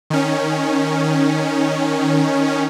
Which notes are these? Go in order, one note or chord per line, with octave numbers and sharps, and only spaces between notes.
D#3 C#4